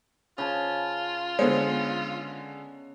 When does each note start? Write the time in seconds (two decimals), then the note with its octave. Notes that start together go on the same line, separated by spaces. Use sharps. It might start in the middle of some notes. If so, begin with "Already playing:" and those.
0.38 C#3 F4 A5
1.39 D3 G#3 B3 C5 C#5